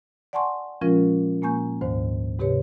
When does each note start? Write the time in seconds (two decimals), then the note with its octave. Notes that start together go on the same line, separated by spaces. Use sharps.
0.33 D5 F#5 G#5 A5 C6 C#6
0.81 A#2 F3 G#3 C#4 F4 A#4
1.42 A#2 A#3 G#5 C#6 G6
1.81 D2 G#2 D#3 C5
2.39 G#2 C3 G4 B4 C#5